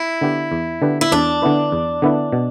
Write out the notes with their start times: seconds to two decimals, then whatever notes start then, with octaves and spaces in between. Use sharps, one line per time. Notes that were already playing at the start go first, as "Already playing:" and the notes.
Already playing: E4
0.21 D3 B3 G4 B4
0.52 E2
0.82 D3 B3 G4 B4
1.01 E4
1.12 E2 D4
1.42 D3 B3 E4 B4
1.72 E2
2.02 D3 B3 E4 B4
2.32 B2